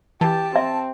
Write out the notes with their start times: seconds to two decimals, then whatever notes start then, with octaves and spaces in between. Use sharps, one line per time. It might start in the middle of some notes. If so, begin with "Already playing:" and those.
0.21 E3 G4 A5
0.56 C4 E5